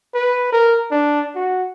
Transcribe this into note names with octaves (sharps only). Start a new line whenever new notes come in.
B4
A#4
D4
F#4